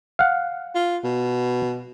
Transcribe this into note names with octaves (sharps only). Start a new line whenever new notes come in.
F5 F#5
F4
B2